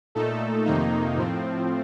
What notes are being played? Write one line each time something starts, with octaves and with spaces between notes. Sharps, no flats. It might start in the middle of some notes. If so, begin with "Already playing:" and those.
A#2 A3 D#4 A4
F2 C3 D#3 A#3 D#4
A2 F3 C4